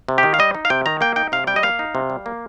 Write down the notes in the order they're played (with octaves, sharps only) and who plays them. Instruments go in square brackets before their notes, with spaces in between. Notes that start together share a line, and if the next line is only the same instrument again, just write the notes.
[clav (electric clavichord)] C3
G4
D#3
F5
G3 D#5
D#4
F5
C3 G5
D#3 A#5
A#3 G5
D#4 G5
C3 F5
G3 G5
D#5
A#3 F5
D#4
C3
G3
A#3